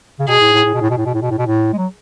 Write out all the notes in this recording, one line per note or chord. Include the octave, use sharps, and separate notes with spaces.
C#3
B2 G#4
A2
A2
A2
B2
A2
B2
A2
B2
A2
B2
A2
B2
A2
G#3
F#3